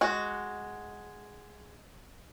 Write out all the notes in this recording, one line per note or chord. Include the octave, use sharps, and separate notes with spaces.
G#3 F#4